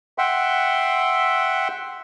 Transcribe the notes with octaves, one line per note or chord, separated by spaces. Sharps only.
E5 F#5 G5 C6